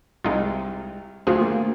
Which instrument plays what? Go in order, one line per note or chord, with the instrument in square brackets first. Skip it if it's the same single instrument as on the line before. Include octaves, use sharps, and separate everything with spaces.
[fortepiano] C2 [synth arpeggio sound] G#3 D#4 F4
[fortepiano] D2 [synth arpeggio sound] F4 F#4 G#4 [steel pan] C5
[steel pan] A#3